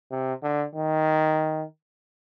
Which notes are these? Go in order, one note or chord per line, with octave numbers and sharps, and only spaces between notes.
C3
D3
D#3